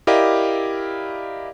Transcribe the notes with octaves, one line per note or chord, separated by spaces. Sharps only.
E4 G4 A#4 D5 D#5 F5